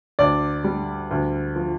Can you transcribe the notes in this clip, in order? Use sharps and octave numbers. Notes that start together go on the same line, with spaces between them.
D2 D5
G3
D2
F3